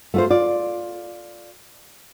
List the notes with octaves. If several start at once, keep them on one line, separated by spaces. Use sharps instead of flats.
A3 F4 C5
F4 D5